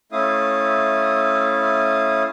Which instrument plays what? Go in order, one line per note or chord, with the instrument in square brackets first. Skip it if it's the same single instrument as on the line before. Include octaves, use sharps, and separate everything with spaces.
[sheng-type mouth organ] A3 C#4 E4 F5 D#6